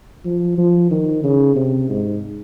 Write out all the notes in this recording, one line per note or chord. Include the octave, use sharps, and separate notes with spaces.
F3
F3
D#3
C#3
C3
G#2